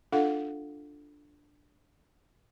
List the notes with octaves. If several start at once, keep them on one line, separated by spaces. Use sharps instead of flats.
D4 F4 A4 F5 F#5